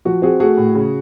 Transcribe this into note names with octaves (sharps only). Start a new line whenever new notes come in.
F3 F#4
C4 F#4 G#4
A3 F#4 G#4
A2
C#3